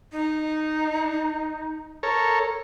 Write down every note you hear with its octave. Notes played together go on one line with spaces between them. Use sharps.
D#4
A4 A#4 C#5